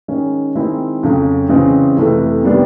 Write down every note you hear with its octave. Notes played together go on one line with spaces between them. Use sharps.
D#3 G#3 C#4
D#3 G#3 C4 E4
F2 C#3 F#3
C#3 E3 G#3 C4
F2 C3 E3 A3
C3 D#3 G3 B3 D4